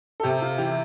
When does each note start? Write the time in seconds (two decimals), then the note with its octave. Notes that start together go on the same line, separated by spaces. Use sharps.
0.20 A4
0.23 C3 G4
0.42 F4
0.58 E3 G4